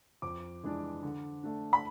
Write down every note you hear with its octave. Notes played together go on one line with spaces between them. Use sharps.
F2 D6
E3 G#3 D4
D3
A3 D4
B5